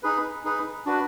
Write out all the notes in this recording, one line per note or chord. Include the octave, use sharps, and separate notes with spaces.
D#4 G#4 B4
D#4 G#4 B4
D4 F#4 B4